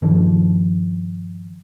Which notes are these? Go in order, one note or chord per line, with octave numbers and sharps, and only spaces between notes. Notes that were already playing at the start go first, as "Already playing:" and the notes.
G2 D#3 F3